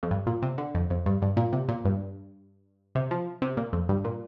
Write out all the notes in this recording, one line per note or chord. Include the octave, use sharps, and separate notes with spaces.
F2
G2
A#2
C3
D3
F2
F2
G2
G2
A#2
C3
A#2
G2
C3
F3
C3
A#2
F2
G2
A#2